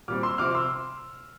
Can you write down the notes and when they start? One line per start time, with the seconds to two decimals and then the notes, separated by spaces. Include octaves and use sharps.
0.08 A#2 G3 C4 D6 F6
0.23 C6 E6
0.38 C3 F3 C4 D6 F6
0.54 C6 E6